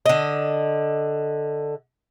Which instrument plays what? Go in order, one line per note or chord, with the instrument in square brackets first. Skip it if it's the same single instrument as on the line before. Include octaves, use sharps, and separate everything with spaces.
[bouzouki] D3 D#5